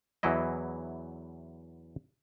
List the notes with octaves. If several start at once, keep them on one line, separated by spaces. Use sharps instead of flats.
E2 E3 F#3 E4 D#5